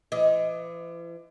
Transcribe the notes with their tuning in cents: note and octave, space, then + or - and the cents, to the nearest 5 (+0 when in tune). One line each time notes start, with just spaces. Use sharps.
E3 +45 D#5 +10